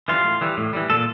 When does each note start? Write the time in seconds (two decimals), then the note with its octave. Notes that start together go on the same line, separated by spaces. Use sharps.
0.08 E3 G3 F4
0.25 A2
0.41 E3 G3
0.57 A2
0.73 E3 G3
0.90 A#2 A4